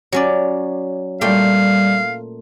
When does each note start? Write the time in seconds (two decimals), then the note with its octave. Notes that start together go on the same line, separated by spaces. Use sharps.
0.12 F#3 C#4 D5
1.21 A#2 G3 A3 F5 G5